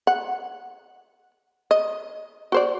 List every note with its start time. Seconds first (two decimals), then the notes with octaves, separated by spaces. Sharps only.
0.07 F#5
1.71 D#5
2.52 F#4 C5 D5